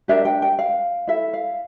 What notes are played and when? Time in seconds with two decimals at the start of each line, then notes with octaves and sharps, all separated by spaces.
0.08 D4 G4 A#4 E5
0.25 G5
0.42 G5
0.59 F5
1.07 E4 A4 E5
1.33 F5